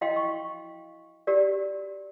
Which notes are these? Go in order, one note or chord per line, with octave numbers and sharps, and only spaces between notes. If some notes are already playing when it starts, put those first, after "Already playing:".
E4 F#4 D#5 F5 G5 C6
C#6
F#4 G4 A#4 D5